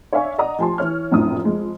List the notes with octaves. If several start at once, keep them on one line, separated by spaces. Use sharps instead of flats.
C#5 D5 E5 F5 G#5 C#6
D5 D#5 F#5 A#5 D#6
F3 G4 G#5 A5 C6
E3 C#5 F6
F1 A#1 F#2 A2 D4 D#6
F2 G#3